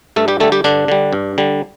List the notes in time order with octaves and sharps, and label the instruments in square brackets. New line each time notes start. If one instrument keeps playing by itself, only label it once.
[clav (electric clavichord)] G2 A3 A4
G3 G4
D3 G3 A3 A4
G3 G4
G2 D3 D4
D3 G3
G2
D3 G3